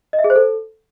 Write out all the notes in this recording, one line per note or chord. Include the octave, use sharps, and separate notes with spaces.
D#5
E5
G#4
C5
A4